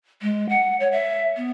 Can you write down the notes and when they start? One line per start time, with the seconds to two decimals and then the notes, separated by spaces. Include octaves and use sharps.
0.22 G#3
0.49 F#5
0.80 C#5
0.92 E5
1.37 B3